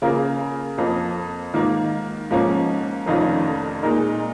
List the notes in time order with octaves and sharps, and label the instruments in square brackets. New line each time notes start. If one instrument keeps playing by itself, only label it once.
[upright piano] C#3 A#3 F4 A#4
F2 F3 A#3
G#2 D#3 A#3 F4
G#2 F3 A#3 C#4
F1 F2 D#3 C#4 F4
A#2 G#3 D#4 A#4